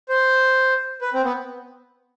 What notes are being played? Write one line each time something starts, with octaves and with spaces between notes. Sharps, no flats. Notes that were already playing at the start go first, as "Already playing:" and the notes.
C5
B4
C4
B3